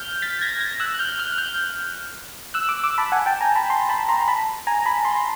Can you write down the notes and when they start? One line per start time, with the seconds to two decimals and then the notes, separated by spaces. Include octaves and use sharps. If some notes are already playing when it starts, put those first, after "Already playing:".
Already playing: F6 G6
0.22 A6 B6
0.41 G#6 A#6
0.61 G#6 A#6
0.80 E6 F#6
0.94 F#6
0.99 F6 G6
1.19 F6 G6
1.32 F#6
1.38 F6 G6
2.54 E6 F#6
2.69 D6 E6
2.83 D6 E6
2.98 A5 B5
3.12 F#5 G#5
3.26 G5 A5
3.41 G#5 A#5
3.55 A5 B5
3.70 A#5 C6
3.89 A5 B5
4.09 A#5 C6
4.22 A#5
4.28 A5 B5
4.67 G#5 A#5
4.86 A5 B5
5.05 A#5 C6